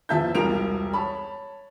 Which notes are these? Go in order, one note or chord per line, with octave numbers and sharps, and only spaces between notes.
E2 F3 E5 A5 G6
E1 C2 F4 A#4 D7 F7
C#5 A5 B5